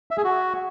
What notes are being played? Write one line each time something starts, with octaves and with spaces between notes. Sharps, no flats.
E5
G#4
F#4